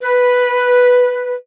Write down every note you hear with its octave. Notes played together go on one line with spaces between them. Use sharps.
B4